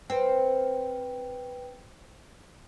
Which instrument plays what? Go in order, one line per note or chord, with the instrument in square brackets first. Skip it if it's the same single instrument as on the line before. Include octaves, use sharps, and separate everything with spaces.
[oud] C4 [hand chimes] B4 G5